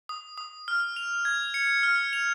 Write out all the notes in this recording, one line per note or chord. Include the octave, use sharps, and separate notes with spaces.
D#6
D#6
F6
F7
G#6
C#7
F6
F7